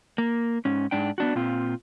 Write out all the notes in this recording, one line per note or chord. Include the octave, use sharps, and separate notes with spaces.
A#3
G#2 C#4
G#2 D4 G5
B3 D4 F#4
A#2 C4 F4